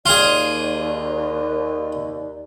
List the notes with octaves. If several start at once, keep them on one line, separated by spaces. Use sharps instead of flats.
D#2 F4 G#4 D5